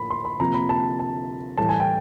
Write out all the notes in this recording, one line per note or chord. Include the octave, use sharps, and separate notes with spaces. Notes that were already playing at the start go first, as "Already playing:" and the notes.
Already playing: A2 F3 A#3 B5
C6
B5
C3 F3 A#3 A#5
B5
A5
A5
A2 E3 G3 A5
G#5
G5